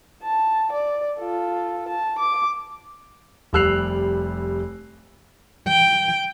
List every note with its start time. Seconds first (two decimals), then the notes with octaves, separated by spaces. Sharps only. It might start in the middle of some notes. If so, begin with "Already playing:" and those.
0.23 A5
0.72 D5
1.19 F4 A4
1.88 A5
2.19 D6
3.53 F1 G3 E6 F#6 C7 F7
5.68 G5